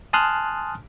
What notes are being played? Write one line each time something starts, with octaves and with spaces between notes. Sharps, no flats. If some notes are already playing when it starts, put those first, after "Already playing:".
G#5 A5 C6 D#6 F6 F#6